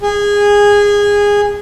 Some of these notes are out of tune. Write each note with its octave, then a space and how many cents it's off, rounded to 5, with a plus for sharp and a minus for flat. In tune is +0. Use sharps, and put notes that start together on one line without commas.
G#4 -20